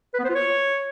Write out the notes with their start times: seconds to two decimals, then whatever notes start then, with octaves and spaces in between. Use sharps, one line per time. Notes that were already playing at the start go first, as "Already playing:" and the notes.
0.14 B4
0.19 B3
0.24 C5
0.29 F4
0.35 C#5